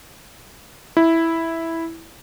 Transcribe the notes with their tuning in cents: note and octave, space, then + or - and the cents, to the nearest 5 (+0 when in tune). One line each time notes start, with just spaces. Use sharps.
E4 -5